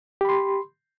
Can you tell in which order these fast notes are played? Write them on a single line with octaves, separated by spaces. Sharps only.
G4 B5 C6